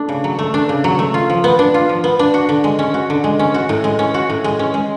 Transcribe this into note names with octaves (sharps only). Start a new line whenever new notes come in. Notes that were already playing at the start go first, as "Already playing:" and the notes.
Already playing: A3 D4
C#3
F#3
A3
D4
C#3
F#3
A3
F4
F3
B3
D4
F4
F3
B3
D4
F#4
D3
G#3
C#4
F#4
D3
G#3
C#4
F#4
A2
G#3
C#4
F#4
A2
G#3
C#4
G#3